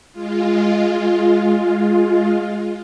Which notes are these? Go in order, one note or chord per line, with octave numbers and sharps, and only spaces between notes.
G#3 F4